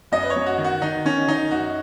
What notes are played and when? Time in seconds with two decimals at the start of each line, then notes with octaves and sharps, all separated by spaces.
0.12 F#2 D#5
0.22 B4
0.30 C#5
0.36 F#2
0.46 F#4
0.58 D#3
0.64 F#4
0.82 D#3 D#4
1.05 D#3 C#4
1.28 D#3 D#4
1.51 F#2 F#4